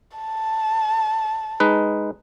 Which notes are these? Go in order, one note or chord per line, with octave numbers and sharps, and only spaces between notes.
A5
G#3 D#4 B4